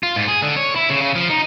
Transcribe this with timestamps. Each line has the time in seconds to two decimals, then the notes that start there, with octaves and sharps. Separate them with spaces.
0.03 F4
0.16 G#2
0.28 G#4
0.42 D3
0.57 C#5
0.76 E4
0.90 C#3
1.02 C#3
1.16 F3
1.30 D#4